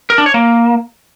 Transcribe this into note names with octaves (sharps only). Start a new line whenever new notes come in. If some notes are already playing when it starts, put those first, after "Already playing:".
A#4
D4
C#5
A#3